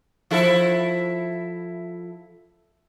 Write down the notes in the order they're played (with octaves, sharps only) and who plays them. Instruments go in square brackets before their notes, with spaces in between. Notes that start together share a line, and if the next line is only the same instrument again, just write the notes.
[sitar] F3 E4 A4